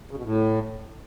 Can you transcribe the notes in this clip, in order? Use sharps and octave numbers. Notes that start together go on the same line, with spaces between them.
C#3
B2
A2